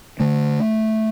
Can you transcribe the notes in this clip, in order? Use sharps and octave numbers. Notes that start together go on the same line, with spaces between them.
D3 A3